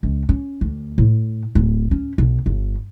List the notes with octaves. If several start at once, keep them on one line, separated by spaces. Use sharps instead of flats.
C#2
C#4
D2
A2
D1
C#4
B1
G1